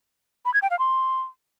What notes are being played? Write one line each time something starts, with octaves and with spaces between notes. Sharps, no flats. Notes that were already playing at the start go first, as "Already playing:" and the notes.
B5
G#6
G5
F5
C6